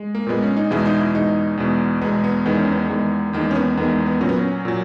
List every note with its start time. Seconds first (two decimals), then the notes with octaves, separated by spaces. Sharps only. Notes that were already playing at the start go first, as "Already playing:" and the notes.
Already playing: G#3
0.15 A#3
0.27 A#2 G#3 B3
0.42 C#4
0.57 D#4
0.71 E2 B2 G#3 E4
0.86 D#4
0.99 E4
1.14 E2 B2 G#3 D#4
1.58 E2 B2 G#3
2.01 E2 B2 G#3 B3
2.24 B3
2.46 E2 D#3 G#3 B3
2.59 C#4
2.72 B3
2.89 E2 D#3 G#3
3.33 E2 D#3 G#3 A#3
3.51 C#4
3.56 B3
3.77 E2 D#3 G#3 B3
4.06 B3
4.21 A#2 F#3 C#4
4.29 B3
4.37 C#4
4.65 A#2 F#3